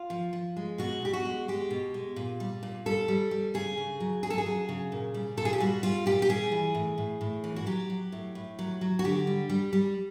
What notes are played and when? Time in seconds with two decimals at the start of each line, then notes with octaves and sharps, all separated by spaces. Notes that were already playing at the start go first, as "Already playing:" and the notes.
Already playing: F4
0.10 F3
0.33 F3
0.57 G#3
0.78 B2 F#4
1.02 B2 G4
1.13 F#4
1.25 G#3
1.48 G#3 G4
1.71 B2
1.94 G#3
2.16 A#2
2.40 G3
2.63 A#2
2.86 G3 A4
3.08 G3
3.31 G3
3.54 C#3 G#4
3.77 C#3
4.00 F#3
4.23 C#3 G#4
4.30 A4
4.38 G#4
4.46 F#3
4.69 C#3
4.92 A#2
5.14 G3
5.37 A#2 A4
5.45 G#4
5.53 G4
5.60 G3 F#4
5.83 G3 F4
6.06 A#2 G4
6.22 G4
6.29 G3 G#4
6.52 E3
6.75 A2
6.98 A2
7.21 A2
7.44 E3
7.56 F#4
7.66 F#3 G4
7.90 F#3
8.12 A2
8.35 A2
8.59 F#3
8.81 F#3
8.99 F#4
9.04 D3 G4
9.27 G3
9.49 G3
9.73 G3